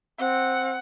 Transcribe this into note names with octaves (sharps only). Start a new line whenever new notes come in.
C4 F#5